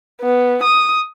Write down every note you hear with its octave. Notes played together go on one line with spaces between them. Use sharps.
B3
D#6